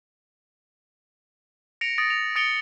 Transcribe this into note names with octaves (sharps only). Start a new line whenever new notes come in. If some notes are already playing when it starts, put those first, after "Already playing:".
A#6 C#7 D7 F7
D#6 A6 A#6 D7
F7
D#6 A6 C#7 D7 F7 G7